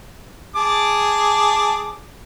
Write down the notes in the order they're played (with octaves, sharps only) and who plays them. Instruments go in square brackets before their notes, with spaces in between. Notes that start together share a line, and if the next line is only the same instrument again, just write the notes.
[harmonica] G#4 A5 D6